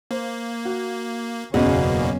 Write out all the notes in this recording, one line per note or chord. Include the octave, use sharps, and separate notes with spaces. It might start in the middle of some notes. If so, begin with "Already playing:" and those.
A#3 C5
F#4
F#1 E2 B2 F#3 A#3 C#4 F#4 G#4